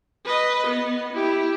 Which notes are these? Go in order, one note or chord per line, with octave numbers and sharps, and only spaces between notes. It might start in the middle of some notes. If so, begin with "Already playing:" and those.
B4 D#5
B3
E4 G4